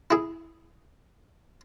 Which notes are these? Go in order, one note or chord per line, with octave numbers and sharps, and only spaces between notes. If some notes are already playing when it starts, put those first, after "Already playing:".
E4 G#4